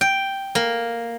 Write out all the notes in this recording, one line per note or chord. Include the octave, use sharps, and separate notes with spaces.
G5
A#3